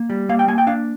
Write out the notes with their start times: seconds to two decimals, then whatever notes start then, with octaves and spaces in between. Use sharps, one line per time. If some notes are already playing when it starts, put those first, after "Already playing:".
Already playing: A#3
0.10 G3
0.29 A#3 F5
0.39 G5
0.48 A#3 G#5
0.58 G5
0.67 D4 F5